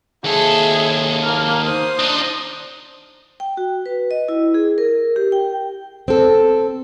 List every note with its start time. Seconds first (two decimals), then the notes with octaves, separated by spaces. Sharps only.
0.24 D#2 G#4 A4 E5
1.23 A#3 F6
1.62 C5 D#6
1.99 D4 D#4
3.40 G5
3.57 F#4
3.86 B4
4.11 D#5
4.29 E4
4.54 G#4
4.78 A#4
5.16 G4
5.32 G5
6.08 C4 A4